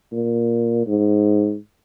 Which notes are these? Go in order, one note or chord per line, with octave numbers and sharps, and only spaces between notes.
A#2
G#2